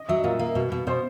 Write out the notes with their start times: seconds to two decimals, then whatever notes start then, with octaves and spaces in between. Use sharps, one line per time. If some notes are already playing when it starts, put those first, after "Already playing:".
Already playing: D#5
0.09 F#3 E5
0.24 A#2 F5
0.39 A#3
0.55 B2
0.72 B2
0.87 B2 C5